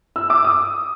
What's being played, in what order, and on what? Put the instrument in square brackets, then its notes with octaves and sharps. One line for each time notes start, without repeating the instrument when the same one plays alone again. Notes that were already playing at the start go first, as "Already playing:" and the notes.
[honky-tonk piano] E6
D6
D#6